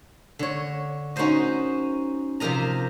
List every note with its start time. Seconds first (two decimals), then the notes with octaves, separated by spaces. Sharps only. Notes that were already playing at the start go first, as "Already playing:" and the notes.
0.39 D3 C#5
1.16 C#4 D#4 F#4 A#4 C5 D#5
2.40 C3 F3 G4 A#4 D#5 A#5